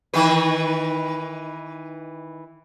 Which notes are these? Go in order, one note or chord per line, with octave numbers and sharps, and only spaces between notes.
D#3 E3 B4